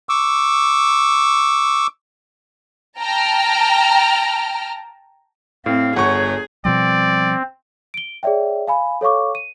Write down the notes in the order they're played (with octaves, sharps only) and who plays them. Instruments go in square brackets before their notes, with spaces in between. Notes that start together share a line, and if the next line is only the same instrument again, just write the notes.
[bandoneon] C#6 D6 E6
[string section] G5 A5 A#5 F6
[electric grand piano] A2 [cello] C4 [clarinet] F5
[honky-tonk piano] G1 [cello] G#4 [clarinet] C#5 [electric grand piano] F#5 C#6
[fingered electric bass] B2 F3 G3 [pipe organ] C4 [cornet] D5
[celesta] D7 G7
G#4 C#5 D5 E5 G5
F5 G#5 B5
A4 C#5 F5 C#6 D6
D#7